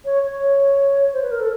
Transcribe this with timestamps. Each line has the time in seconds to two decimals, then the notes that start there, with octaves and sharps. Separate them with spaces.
0.05 C#5
0.23 C#5
1.13 C5
1.22 B4
1.31 A#4
1.40 A4